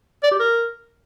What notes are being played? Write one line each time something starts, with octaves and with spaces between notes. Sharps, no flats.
D5
G4
A#4